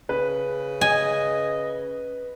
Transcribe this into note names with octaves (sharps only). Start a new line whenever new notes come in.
C#3 B4
D#5 G#5